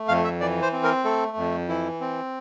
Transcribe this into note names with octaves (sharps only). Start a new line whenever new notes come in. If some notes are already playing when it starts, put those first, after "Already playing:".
Already playing: A3
F2 F5
E5
E3 D5
C5
C4
A#4
A3 A4
F2
E3 E4
C4